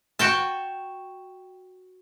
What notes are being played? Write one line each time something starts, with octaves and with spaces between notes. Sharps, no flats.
F#4 G5 A5